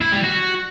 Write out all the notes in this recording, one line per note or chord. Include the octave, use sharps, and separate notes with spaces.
E4
G3
F#4